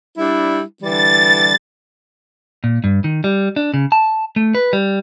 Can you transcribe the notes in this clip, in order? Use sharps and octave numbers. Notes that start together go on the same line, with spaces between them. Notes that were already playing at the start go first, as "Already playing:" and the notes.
G3 D4 E4
D3 E3 G3 A6
A#2
G2
D#3
G3
D4
C#3
A5
A3
B4
G3